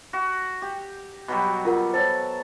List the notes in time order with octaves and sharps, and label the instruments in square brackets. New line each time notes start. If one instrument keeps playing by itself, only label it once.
[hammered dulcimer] F#4
G4
B2 F#3 G3
[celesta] F4 A#4 F#5
[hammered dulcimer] A4 [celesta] C5 C#5